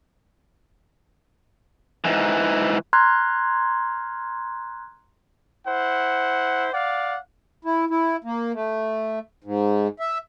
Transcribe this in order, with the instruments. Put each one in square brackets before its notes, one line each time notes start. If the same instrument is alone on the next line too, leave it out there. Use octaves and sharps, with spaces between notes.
[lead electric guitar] G#2 E3
[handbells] A#5 C6 F6 F#6 G#6
[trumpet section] E4 C5 F#5
D5 F5 F#5
[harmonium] E4
E4
A#3
A3
G#2
E5